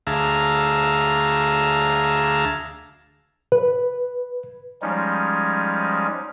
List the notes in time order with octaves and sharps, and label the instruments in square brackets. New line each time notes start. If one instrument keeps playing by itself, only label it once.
[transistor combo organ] D2 G#4 E5 F5 A5 A#5
[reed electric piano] B4
[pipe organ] F3 G3 G#3 C#4 D#4